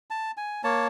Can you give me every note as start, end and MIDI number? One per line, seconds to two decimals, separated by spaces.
0.10 0.31 81
0.37 0.62 80
0.64 0.88 58
0.64 0.88 73
0.64 0.88 81